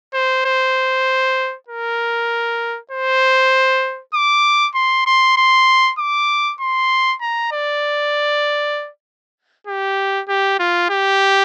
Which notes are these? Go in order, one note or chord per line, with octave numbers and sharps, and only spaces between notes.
C5
C5
A#4
C5
D6
C6
C6
C6
D6
C6
A#5
D5
G4
G4
F4
G4